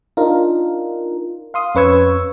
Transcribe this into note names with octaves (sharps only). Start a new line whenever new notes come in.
D4 D#4 F4 A#4
F5 C6 D#6
F2 C#4 B4 C#6 E6 G#6